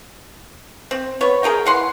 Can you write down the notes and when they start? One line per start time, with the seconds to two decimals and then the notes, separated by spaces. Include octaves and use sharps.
0.91 C4
1.21 B3 C#5
1.43 G#4 A#4 D#5 G5
1.66 E3 F#5 C6